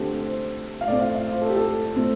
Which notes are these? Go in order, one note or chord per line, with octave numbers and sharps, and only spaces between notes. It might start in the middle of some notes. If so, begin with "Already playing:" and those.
Already playing: D3 A3 C4 G4 A4
C5
F5
A2 A3 C4 D5
F5
F5
C5
A4
G4
A4
A2 A3 C4